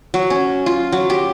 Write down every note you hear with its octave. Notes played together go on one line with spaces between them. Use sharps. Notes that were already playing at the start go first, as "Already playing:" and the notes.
F#3
C#4
F4
F#3
G4